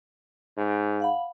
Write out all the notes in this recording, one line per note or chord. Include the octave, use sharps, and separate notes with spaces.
G#2
F5 F#5 B5